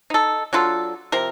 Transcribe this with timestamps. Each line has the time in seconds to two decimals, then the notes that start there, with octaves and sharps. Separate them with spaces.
0.10 D#4 A4
0.53 F#3 D4 F4 A4
1.12 C3 F3 A#4